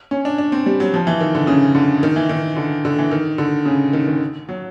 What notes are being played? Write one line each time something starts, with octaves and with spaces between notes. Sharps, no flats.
C#4
D4
D4
C4
G3
F#3
F3
E3
D#3
D3
C#3
D3
D#3
E3
D#3
D3
D3
E3
D#3
D3
C#3
D#3
D#3
F#3